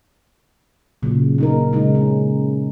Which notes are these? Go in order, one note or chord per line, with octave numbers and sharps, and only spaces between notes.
A#2 C#3 F#3
A#3 D#4 A#4
C#3 G#3 D#4
C#4